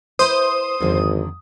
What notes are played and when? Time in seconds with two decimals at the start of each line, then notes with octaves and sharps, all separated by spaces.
0.19 E4 B4 C5 D#6
0.80 G#1 F2 D3 D#3